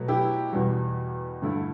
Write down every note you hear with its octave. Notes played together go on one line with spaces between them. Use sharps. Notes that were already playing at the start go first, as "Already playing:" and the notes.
Already playing: B2 F#3 A3
E4 G4
E2 B2 G3 F#4
G2 D3 A3 E4